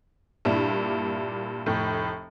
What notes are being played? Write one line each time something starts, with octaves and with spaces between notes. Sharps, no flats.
G2 A#2 D4 E4
F1 A2